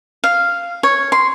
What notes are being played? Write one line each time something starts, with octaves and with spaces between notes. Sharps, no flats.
F5
C#5
C6